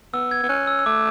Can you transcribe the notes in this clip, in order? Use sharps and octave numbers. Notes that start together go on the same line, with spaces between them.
B3 E6
G#6
B3
C#4 F#6
E6
E6
A3 D6